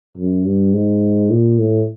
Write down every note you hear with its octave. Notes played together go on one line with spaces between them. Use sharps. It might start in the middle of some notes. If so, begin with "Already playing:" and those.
F#2
G2
G#2
A#2
A2